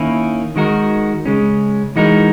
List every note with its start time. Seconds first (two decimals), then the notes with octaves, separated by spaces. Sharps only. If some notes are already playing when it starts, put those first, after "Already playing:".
Already playing: D#3 A#3 C#4 E4
0.56 D#3 G#3 D#4 F#4 A#4
1.26 C#3 G#3 C#4
1.96 E3 G#3 D#4 F#4 A#4